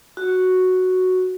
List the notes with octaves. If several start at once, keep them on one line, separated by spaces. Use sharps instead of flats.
F#4